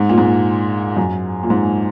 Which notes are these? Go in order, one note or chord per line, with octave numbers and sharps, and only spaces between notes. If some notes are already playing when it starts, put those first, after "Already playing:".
Already playing: G#2
A#2
G#2
F#2
A#2
G#2